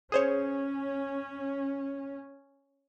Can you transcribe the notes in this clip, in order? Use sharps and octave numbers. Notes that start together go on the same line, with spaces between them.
C#4 G#4 C5 C#5